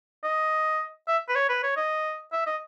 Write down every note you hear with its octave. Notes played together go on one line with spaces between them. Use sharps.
D#5
E5
B4
C#5
B4
C#5
D#5
E5
D#5